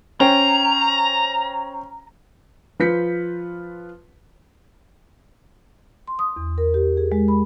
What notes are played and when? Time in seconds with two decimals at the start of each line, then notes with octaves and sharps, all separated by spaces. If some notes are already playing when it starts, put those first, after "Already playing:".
0.20 C#4 C5 G5 A#5
2.79 F3 F4 B4 G6 B6 C#7
6.08 C6
6.19 D#6
6.36 E2
6.58 A#4
6.74 G4
6.97 G#4
7.12 G#3
7.28 B5